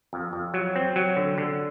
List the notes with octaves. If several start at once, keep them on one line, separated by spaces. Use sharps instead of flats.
F2
F2
F#3
C4
F#3
D3
D3